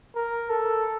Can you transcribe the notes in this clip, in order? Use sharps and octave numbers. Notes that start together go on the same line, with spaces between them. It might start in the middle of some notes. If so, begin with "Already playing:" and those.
A#4
A4